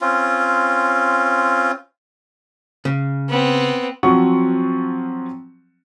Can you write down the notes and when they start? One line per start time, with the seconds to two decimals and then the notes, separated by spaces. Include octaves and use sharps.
0.01 C4 C#4 F4
2.85 C#3
3.29 B3 C4
4.03 F3 F#3 C4 F4 F#5 C#6